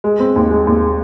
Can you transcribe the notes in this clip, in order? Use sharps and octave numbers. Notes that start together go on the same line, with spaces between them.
G#3
C4
D#2
G#3
D#2
G#3